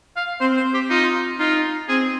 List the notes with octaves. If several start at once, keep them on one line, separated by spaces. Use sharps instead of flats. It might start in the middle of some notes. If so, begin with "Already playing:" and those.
F5
C4 C5
C5
G4
D#4 F4
D#4 F4
C4 G#4